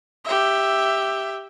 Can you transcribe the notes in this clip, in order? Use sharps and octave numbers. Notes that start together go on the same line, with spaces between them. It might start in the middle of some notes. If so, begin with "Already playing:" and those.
G4 E5